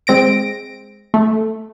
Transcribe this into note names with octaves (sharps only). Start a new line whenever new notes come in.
G#3 C4 A#6 D7
A3